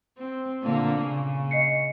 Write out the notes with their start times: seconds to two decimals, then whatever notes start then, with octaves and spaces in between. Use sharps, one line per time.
0.18 C4
0.63 A#2 D3 A#3
1.02 C#3
1.51 D#5 C7 C#7